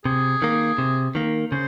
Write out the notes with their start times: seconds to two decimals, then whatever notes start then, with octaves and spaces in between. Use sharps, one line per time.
0.05 C3 G#4
0.42 D#3 A#3
0.78 C3
1.15 D#3 A#3
1.52 C#3 C5